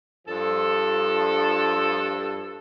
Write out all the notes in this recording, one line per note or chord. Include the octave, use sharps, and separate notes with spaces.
G2 F3 D4 A4